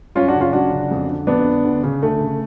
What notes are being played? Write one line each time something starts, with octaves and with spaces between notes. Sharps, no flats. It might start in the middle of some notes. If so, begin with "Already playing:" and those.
F#2 C#4 F4
D4 F#4
C#3
C#4 F4
F#2 D4 F#4
C#3
F2
D3
F2 B3 D4
D3
D2
C#3
D2 A3
C#3